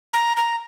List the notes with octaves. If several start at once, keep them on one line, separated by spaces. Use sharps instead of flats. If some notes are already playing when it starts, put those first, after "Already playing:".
A#5
A#5